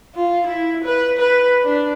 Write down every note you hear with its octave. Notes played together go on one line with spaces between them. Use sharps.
F4
E4
B4
B4
D4